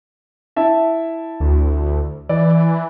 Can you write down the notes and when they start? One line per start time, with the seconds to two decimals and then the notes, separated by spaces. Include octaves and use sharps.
0.56 E4 E5 A5
1.40 D2
2.29 E3 D5